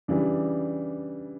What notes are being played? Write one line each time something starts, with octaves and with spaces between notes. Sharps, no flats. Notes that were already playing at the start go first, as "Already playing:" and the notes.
C#3 E3 G3 D4